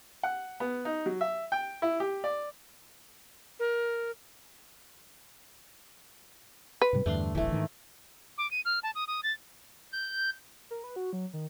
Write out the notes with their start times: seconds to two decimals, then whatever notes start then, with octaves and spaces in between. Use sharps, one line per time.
0.23 F#5
0.60 B3
0.85 D#4
1.06 F#3
1.21 E5
1.52 G5
1.82 E4
2.00 G4
2.24 D5
3.59 A#4
6.81 B4
6.93 G#2 C3 G3
7.06 E2 G2 D3 A3 D4 C6
7.35 D1 G#1 E3 A3
7.52 G#2 D#3
8.38 D6
8.51 D#7
8.65 F6
8.83 A5
8.95 D#6
9.08 D#6
9.23 A6
9.92 G6
10.71 A#4
10.84 B4
10.96 F#4
11.13 F#3
11.33 D#3